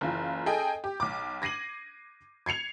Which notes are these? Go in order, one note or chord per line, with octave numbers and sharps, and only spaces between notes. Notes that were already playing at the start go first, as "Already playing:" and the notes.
F#1 E3 F4
G#4 A4 D#5 G5 G#5
G4
B1 D6
G#6 A#6 C7 D#7 F#7
G#6 C7 C#7 F7